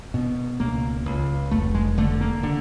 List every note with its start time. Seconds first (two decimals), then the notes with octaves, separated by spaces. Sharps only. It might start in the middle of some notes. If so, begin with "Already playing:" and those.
0.14 B2
0.60 C#2 A#3
1.06 C#2
1.51 F1 A3
1.74 G#3
1.98 D3 A3
2.21 A#3
2.43 D3